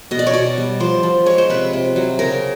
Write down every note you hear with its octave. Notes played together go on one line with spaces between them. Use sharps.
B2 D#5
D5
C#5
B2 D5
G3
F3 C5
F3
G#3 C#5
C5
C3 B4
C3
F#3
C#3 A#4